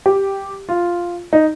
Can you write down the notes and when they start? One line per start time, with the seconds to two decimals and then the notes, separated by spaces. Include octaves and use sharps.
0.06 G4
0.69 F4
1.33 D#4